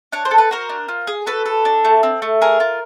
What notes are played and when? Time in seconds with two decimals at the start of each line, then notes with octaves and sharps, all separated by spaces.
0.12 D4 C#5
0.25 C5
0.31 A4
0.38 B4
0.51 F#4 A#4 C5
0.69 D4
0.88 F4
1.07 G#4
1.26 F#4 A4 B4
1.46 A4
1.65 D4
1.85 A3
2.03 C4
2.22 A3
2.42 G#4 A#4
2.60 F4